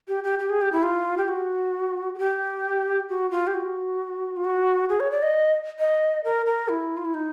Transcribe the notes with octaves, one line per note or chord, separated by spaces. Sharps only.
G4
G4
G4
G#4
G4
E4
F4
G4
F#4
G#4
G4
F#4
F4
G4
F#4
F4
F#4
G#4
C#5
D5
D#5
D#5
A#4
A#4
E4
F4
E4
D#4